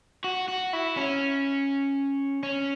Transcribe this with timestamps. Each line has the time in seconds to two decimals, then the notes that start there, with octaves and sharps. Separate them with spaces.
0.24 F#4
0.48 F#4
0.73 E4
0.97 C#4
2.43 C#4